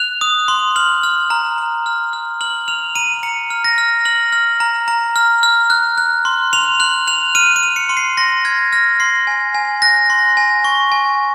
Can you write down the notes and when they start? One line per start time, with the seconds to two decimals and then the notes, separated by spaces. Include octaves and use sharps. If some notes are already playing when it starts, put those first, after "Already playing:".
Already playing: F#6 F7
0.21 D#6
0.48 C6
0.76 F6 F#7
1.03 F6
1.30 A#5
1.58 A#5
1.86 F6
2.13 F6
2.41 F6 F#7
2.68 F6 F7
2.95 A#5 D#7
3.23 A#5 C#7
3.50 F6
3.64 A#6
3.78 F6
4.05 F6 F#7
4.32 F6
4.60 A#5
4.88 A#5
5.16 F6
5.43 F6
5.70 F#6
5.98 F#6
6.25 C6
6.53 C6 F7
6.80 F#6 F#7
7.07 F#6 F7
7.35 F6 D#7
7.56 D#7
7.63 F6
7.76 C#7
7.89 C6
7.97 C7
8.17 C6 A#6
8.45 F6 G#6
8.73 F6 A#6
9.00 C6 C7
9.27 G#5
9.55 G#5
9.82 F#6 A#6
10.10 C6
10.37 G#5
10.64 C#6
10.92 G#5